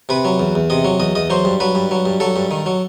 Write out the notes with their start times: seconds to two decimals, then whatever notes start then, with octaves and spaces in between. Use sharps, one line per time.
0.09 C3 B4
0.25 F#3
0.40 E2
0.55 E2
0.70 C3 D#5
0.85 F#3
1.00 E2 D#5
1.15 E2 D#5
1.30 F#3 C5
1.45 G2
1.60 F#3 B4
1.75 G2
1.91 F#3
2.06 G2
2.20 F#3 A4
2.36 G2
2.51 D#3
2.66 F#3